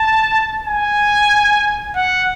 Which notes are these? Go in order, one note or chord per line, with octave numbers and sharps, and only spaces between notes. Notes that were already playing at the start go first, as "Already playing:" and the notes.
Already playing: A5
G#5
F#5